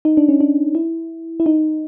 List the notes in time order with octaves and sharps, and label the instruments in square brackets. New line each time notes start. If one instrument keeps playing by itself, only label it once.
[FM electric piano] D#4
D4
C#4
D4
E4
E4
D#4